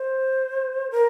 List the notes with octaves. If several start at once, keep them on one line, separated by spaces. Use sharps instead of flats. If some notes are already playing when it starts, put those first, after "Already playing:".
Already playing: C5
A#4